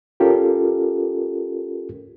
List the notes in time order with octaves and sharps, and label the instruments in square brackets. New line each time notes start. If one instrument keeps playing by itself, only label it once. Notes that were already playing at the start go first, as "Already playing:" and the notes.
[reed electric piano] C#4 F4 G4 A4 A#4